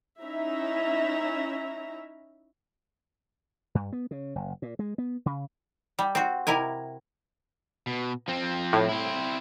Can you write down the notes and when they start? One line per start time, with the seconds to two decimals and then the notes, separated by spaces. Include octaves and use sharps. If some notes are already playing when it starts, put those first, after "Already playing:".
0.20 C#4 D#4 E4 E5 A#5
3.75 G2
3.93 B3
4.11 C#3
4.35 F#1
4.62 A#2
4.79 G#3
4.98 B3
5.26 C#3
5.99 G3
6.15 C4 F#4
6.47 C3 E4 A#4 G#5
7.87 B2
8.28 F3 C4
8.73 A2
8.89 C4 E4